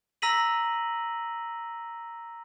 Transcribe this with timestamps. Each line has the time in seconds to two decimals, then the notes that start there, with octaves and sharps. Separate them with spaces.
0.22 A#5 E6 A#6 B6 D#7 F#7